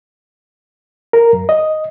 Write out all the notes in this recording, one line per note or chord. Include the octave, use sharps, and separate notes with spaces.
A#4
F#2
D#5